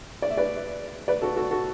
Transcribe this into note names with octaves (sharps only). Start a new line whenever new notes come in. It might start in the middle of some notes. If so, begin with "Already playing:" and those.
D5
E5
B4 D5
B4 D5
F#4 A4
F#4 A4
F#4 A4